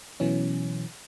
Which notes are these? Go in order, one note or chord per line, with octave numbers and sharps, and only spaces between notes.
B2 E3 F#3 C#4